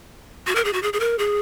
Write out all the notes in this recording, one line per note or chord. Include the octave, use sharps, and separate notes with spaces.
F#4
A#4
G#4
F#4
G#4
G#4
A#4
G#4